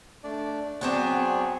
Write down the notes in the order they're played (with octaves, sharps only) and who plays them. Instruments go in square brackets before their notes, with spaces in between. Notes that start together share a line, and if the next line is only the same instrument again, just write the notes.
[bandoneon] A3 D4 D5
[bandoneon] F#3 G#4 C#5 [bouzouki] B3 C4 D4